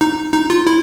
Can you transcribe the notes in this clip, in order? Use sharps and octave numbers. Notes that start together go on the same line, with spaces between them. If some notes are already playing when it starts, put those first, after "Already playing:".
D#4
D#4
F4
E4